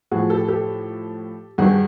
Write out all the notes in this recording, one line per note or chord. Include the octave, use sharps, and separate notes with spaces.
A2 F3 F#4 G#4
G4 A4
G4 A4
G2 D#3 F#3 F#4 G#4